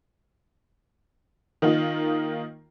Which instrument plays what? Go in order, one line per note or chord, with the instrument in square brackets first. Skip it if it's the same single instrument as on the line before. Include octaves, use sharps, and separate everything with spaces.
[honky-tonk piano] D#3 A#3 D#4 F4